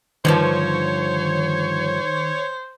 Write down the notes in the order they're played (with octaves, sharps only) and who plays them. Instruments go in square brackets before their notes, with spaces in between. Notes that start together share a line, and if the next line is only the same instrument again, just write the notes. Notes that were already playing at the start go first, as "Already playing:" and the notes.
[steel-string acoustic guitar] G2 D3 F3 [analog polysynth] D#3 [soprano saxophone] C5 [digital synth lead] C#5